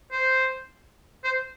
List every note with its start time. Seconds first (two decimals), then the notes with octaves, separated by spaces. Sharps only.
0.12 C5
1.24 C5